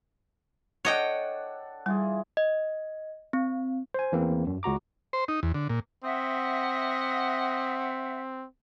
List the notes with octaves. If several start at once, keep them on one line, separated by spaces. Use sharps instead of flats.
D4 A4 C#5 D#5 F#5 G5
E3 G3 F4 G#4
D#5
C4
C5 G#5
E2 E3 A#3 C4
F#2
C#2 F#4 A#5 D6
C5
D#4
E2
D3
A#2
C4 D#5 E5 F#5